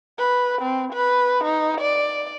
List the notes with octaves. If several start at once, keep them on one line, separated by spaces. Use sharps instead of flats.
B4
C4
B4
D#4
D5